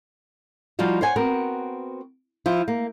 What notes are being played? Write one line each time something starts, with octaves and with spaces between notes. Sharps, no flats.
F3 G3 D#4 F4 F#4
C5 C#5 F#5 G#5
B3 C4 F#4 A#4
F3 E4 F4
A#3